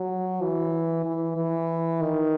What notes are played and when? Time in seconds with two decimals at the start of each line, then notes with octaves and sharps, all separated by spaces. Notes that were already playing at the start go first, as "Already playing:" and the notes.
Already playing: F#3
0.42 E3
1.05 E3
1.37 E3
2.01 D#3